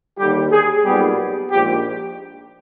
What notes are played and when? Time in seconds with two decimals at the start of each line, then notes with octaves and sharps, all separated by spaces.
0.18 D#2 D3 G3 G4
0.51 G#4
0.85 B1 A#2 G3 B3 G4
1.51 A#1 G#2 G4